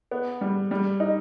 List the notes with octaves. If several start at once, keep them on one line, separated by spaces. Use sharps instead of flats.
B3
G3
G3
D#4